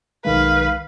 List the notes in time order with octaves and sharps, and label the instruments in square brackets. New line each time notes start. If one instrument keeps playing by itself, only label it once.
[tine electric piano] B1 D#3 G#3 [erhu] B4 [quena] F5